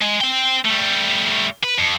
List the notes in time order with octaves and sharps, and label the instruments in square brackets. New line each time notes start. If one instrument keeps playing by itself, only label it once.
[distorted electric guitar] G#3
C4 G5
G3 A3
B4
F2